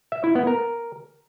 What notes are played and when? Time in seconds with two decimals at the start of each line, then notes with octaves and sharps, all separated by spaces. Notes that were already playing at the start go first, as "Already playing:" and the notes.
0.12 E5
0.24 E4
0.35 B3
0.47 A#4